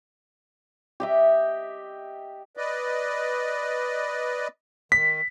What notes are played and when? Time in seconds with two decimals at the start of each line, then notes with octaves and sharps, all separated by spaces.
1.00 G4 D#5 E5
2.57 B4 D5 D#5
4.92 D#3 B6